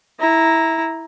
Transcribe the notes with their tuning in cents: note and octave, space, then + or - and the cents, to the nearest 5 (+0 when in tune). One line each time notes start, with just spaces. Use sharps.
E4 -10 A#5 +5